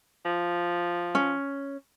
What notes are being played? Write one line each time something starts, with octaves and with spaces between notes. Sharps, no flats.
F3
C#4